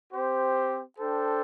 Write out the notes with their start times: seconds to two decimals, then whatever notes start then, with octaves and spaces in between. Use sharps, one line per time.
0.12 C4 G4 C5
0.99 D4 A4 C5 G5